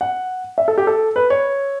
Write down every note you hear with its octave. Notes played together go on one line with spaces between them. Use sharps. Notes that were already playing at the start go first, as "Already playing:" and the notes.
F#5
E5
A4
G4
A4
B4
C#5